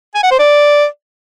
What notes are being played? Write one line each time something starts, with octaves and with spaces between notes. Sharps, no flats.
G#5
F#5
C5
D5